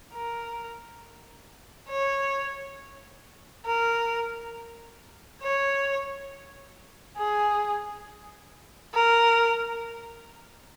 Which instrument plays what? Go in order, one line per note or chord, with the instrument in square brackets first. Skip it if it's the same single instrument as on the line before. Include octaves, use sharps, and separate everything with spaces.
[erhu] A#4
C#5
A#4
C#5
G#4
A#4